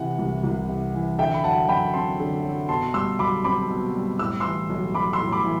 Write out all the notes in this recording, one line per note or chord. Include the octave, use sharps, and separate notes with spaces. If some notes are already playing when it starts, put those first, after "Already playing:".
Already playing: C3 E3 F#5
C2
C2
C3
E3
D3 E5 G5
B5
F#3 F#5 A5
F#2 G5 B5
C4 A5 C6
D3
F#3
B2 A5 C6
G3 C6 E6
B1 B5 D6
C4 B5 D6
B2
G3
A2 E6
E3 C6 E6
B1
B1 B5 D6
C6 E6
A2
B5 D6
E3